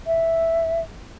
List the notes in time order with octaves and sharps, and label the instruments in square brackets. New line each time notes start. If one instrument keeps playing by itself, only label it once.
[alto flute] E5